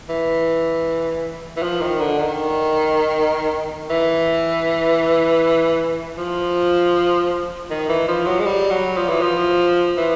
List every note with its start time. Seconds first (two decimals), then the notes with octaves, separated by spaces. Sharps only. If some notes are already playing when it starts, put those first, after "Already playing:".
0.09 E3
1.57 E3
1.63 F3
1.81 D#3
2.00 D3
2.19 D#3
3.90 E3
6.18 F3
7.70 D#3
7.89 E3
8.08 F3
8.26 F#3
8.40 G#3
8.46 G3
8.71 F#3
8.97 F3
9.09 E3
9.22 F3
9.98 E3